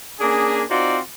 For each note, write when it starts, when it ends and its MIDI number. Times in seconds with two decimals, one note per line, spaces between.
0.20 0.62 58
0.20 0.62 61
0.20 0.62 62
0.20 0.62 68
0.69 0.98 60
0.69 0.98 63
0.69 0.98 65
0.69 0.98 66
0.69 0.98 72
0.69 0.98 74